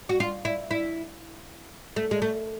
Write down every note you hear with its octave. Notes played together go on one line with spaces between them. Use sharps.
F#4
F4
E4
E4
A3
G#3
A3